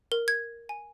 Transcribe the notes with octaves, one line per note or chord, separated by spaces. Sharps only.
A#4
G#6
G#5